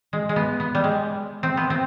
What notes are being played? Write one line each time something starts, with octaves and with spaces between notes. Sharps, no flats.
G#3
G#3
B3
B3
G3
G#3
C4
B3
C4